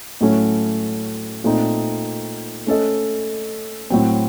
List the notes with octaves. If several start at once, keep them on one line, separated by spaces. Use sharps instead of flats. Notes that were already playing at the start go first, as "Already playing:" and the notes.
A2 F#3 A3 C#4
A#2 A3 C4 D#4
A3 C#4 A4 D#5
A2 F#3 C4